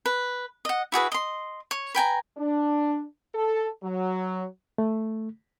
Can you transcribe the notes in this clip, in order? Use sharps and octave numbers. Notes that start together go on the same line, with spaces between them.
B4
D#5 F#5
E4 F#4 G#4 B4
D#5 C6
C#5
B4 G5 G#5 A#5
D4
A4
F#3
A3